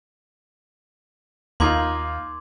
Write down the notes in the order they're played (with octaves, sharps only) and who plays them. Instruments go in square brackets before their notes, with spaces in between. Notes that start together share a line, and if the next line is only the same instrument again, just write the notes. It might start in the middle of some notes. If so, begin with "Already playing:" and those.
[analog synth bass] D#2 [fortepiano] A#3 D#4 F4 [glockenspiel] C6 D6 G#6